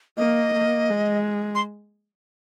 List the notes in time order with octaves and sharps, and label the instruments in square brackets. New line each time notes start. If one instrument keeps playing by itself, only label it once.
[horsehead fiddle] A#3 [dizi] D#5
[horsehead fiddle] A#3
G#3
[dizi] C6